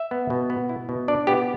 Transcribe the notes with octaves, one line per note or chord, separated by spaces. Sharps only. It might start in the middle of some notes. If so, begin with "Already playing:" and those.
Already playing: E5
B3
B2
B3
E4
B2
D4 D5
B3 G4